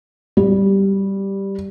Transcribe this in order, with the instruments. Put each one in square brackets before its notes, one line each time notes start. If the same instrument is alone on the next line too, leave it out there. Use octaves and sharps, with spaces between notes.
[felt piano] G3